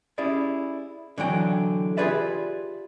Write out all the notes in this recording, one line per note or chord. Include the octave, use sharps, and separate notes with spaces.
C#4 E4 G4 G#4 D5
D3 E3 F#3 G5
F4 G4 G#4 B4 D5 E5